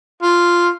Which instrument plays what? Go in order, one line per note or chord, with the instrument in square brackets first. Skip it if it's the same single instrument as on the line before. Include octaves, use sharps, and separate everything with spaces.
[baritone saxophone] F4